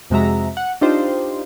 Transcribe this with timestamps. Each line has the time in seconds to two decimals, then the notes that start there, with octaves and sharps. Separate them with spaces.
0.10 F2 C3 G#3 F#4 E5 A#5
0.57 F#5
0.81 D4 D#4 F4 G4 C5